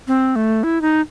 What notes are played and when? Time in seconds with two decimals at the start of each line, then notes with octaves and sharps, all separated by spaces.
0.08 C4
0.36 A3
0.63 E4
0.82 D#4